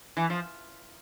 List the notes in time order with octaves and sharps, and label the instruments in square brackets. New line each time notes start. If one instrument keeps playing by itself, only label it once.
[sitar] E3
F3